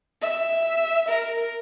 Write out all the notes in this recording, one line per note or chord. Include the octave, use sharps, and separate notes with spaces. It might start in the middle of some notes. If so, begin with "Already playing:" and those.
E5
A#4